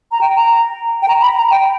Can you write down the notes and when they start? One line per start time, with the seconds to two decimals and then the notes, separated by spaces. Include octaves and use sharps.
0.12 A#5
0.21 G5
0.36 A#5
1.02 G5
1.08 A#5
1.22 B5
1.37 A#5
1.51 G5